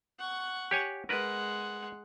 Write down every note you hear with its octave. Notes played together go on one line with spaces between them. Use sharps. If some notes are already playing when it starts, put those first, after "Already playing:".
F#5 C#6
G4 C#5 G#5
G#3 A#4 B4 F#5